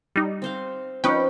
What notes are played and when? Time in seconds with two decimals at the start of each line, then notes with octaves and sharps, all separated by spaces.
0.16 G3 D#4
0.42 C4 C5 F5
1.04 F3 C#4 D#4 B4 G5